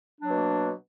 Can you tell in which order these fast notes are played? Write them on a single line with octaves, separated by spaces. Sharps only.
D4 F#3 A#3 B2